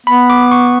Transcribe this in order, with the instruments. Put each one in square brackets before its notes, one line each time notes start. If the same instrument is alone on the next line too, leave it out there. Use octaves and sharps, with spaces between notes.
[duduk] B3 [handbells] B5
[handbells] D6
C#6